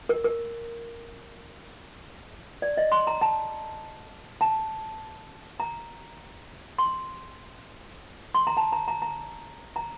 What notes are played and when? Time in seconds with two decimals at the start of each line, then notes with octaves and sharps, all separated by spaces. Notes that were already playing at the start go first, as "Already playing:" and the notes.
0.09 A#4
0.24 A#4
2.62 D5
2.77 D#5
2.92 C6
3.07 A#5
3.21 A5
4.41 A5
5.60 A#5
6.78 C6
8.35 C6
8.47 A#5
8.57 A5
8.72 A#5
8.88 A#5
9.02 A#5
9.76 A#5